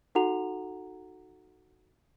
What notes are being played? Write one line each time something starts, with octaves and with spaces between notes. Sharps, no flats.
D#4 F#4 A4 F#5 A#5 F7